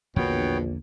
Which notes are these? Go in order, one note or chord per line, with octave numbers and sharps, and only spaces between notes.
A#1 E2 B2 D3 A#3 B3 C#5 G5